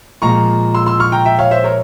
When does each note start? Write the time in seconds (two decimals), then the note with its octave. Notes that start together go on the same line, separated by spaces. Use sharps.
0.22 A#2 F3 G#3 A#5 C#6
0.74 C6 E6
0.86 C6 E6
1.00 C#6 F6
1.12 G5 A#5
1.25 E5 G5
1.38 C#5 F5
1.51 C5 E5
1.64 A#4 C#5